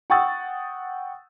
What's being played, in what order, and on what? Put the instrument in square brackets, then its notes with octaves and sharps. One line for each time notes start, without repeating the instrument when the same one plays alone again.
[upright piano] F#5 G5 C#6 D#6 E6 A6